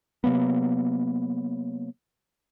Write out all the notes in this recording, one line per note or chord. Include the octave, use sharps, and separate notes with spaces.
C3 F#3 A#3 B3